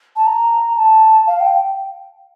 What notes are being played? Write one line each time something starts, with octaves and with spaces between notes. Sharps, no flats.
A5
A#5
A5
F5
G5